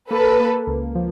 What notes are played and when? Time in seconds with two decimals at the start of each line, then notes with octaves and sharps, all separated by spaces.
0.11 A#3 A4 B4
0.40 A#3
0.67 C#2
0.95 F3